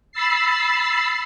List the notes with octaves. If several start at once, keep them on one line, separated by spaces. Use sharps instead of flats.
B5 E6 A6 C7